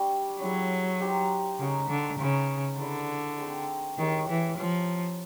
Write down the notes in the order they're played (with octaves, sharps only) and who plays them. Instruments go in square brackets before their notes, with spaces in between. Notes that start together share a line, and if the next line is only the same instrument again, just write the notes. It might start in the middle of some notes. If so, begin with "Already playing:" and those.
Already playing: [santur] G3 D4 F#4
[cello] F#3 [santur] C#4 E4 G#4
[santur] D#4 G4 C5
[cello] C#3 [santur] D#4 F#4 A#4
[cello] D3
[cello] C#3 [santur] A#3 D#4 F#4 B4
[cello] D3 [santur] E4 G#4 B4 D5
[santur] G#3 C4 D#4 G#4
[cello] D#3 [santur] G#3 C#4 E4 G4
[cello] E3
[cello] F3 [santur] A#3 C#4 F#4